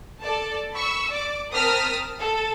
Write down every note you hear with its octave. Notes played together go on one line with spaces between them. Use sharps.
A4 D5 A5
B5 C#6 E6
D5 D6
C4 A#4 A5 D#6 F6 B6
A4